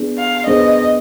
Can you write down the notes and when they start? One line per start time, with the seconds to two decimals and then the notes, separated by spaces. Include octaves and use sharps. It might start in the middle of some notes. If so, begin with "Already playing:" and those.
Already playing: B3 D4 G#4
0.19 F5
0.46 B3 D4 G#4 C5 D#5